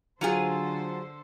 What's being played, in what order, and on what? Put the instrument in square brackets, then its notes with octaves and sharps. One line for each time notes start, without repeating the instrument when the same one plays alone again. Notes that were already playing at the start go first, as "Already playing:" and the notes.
[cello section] D3 A4 C5 [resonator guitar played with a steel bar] F#3 F4 G#4